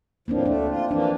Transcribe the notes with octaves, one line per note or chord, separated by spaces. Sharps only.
A2 F3 A#3 C4 D4
D2 A3 D4
F4
E3 F3 A#3 D4